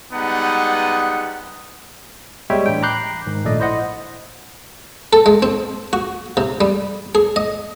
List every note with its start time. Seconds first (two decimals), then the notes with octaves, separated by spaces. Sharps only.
0.13 G3 G#3 B3 D#4 F#5
2.50 G3 G#3 B3 C#5 E5 G5
2.66 A2 E3 D4 G5
2.83 A#5 B5 D6 F#6 G6 C7
3.26 G#2 D#3
3.44 A#1 A#2 A3 A4 D5 D#5
3.60 E4 C5 D#5 F#5
5.13 A4
5.26 G#3
5.42 C4
5.93 F#4
6.37 C3
6.61 G3
7.15 G#4
7.36 D#5